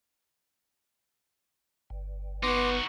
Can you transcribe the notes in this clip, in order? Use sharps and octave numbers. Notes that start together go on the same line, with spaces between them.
G1
B3 D#4 F#4 C6 D6